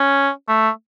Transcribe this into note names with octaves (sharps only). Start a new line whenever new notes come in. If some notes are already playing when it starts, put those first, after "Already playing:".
Already playing: C#4
A3